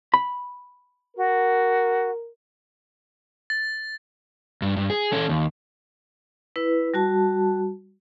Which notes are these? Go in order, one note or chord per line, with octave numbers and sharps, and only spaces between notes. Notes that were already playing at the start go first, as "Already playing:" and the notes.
B5
F#4 A#4
A6
G2
G2
G#4
C#4 A4
D#2
E4 B4
G3 F#4 A5